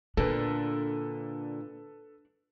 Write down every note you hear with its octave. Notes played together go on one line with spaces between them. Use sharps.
A#2 D3 A#3 D4 A4 B4